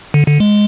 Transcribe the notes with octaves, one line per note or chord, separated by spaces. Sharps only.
D3
D3
G#3